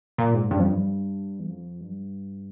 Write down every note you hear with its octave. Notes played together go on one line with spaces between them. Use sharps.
A#2
G#2
G2
F2
G2
E2
F2
G2